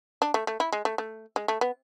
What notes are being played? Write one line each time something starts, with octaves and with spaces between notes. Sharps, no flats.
D4
A3
A3
E4
G#3
A3
A3
G#3
A3
B3